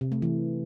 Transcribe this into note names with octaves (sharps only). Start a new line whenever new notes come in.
C3
A3
E3